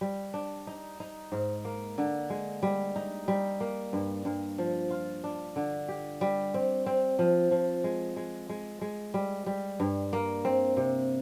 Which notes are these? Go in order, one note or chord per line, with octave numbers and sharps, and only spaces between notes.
G3
D4
D#4
D#4
G#2
A#3
D3
G#3
G3
D#4
G3
A#3
G2
G2
F3
F4
D4
D3
G4
G3
C4
C4
F3
F3
G#3
G#3
G#3
G#3
G3
G3
G2
A#3
C4
C3